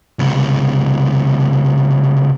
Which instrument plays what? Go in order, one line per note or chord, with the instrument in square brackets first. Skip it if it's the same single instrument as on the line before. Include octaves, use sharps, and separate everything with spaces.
[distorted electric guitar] C#2 C3